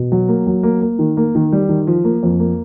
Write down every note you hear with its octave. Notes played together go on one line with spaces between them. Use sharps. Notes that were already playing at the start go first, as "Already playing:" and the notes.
Already playing: B2
F#3
A#3
F#3
A#3
A#3
D#3
A#3
D#3
G3
D#3
F3
A#3
F2
A#3